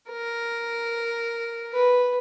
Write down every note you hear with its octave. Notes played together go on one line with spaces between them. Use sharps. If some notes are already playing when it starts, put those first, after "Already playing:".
A#4
B4